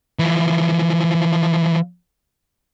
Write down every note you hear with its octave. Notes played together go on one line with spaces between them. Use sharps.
E3 F3